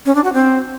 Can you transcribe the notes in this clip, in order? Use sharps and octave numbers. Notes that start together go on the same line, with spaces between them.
C#4
D4
F#4
C4